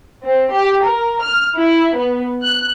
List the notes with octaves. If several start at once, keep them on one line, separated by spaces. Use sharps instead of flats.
C4
G4
A#4
F6
E4
B3
F#6